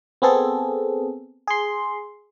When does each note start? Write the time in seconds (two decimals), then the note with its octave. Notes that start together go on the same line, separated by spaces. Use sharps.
0.22 B3 C4 G#4 A4
1.47 G#4 C6